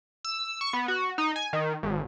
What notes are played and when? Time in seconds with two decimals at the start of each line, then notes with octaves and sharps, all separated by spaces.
0.25 E6
0.61 C#6
0.73 B3
0.88 F#4
1.18 D#4
1.36 G#5
1.53 D#3
1.83 G#1